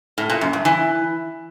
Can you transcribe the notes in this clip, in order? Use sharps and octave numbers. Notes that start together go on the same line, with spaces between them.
A2
A#2
F#2
G2
E3